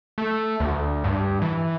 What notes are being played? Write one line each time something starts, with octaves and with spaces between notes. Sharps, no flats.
A3
D2
G2
E3